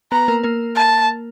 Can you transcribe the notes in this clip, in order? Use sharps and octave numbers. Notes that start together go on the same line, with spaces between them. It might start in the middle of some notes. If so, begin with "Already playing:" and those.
B3 B4 A#5
A#3 A#4
A#3 A#4
A5